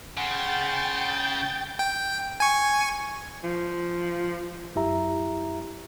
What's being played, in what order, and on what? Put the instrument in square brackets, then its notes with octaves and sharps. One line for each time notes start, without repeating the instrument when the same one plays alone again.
[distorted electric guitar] C#3 [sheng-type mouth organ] F#5 C6 [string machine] G5 G6 A6
[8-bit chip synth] G5
G#5 C#6
[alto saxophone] F3
[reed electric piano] F#2 E4 G4 E5 A#5